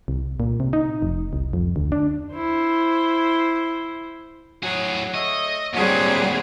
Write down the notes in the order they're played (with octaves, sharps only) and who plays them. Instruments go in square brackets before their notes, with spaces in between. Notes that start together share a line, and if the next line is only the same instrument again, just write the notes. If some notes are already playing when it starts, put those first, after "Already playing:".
[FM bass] C2
A#2
C3
D#4
F1
C2
F2
D2
D4
[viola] E4 C5
[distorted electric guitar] A2 G#4 [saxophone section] F#3
[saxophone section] A3 C#5 E5 [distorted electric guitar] D#5
[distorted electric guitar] D2 A#2 [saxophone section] F#3 [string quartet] G3 C4 G#4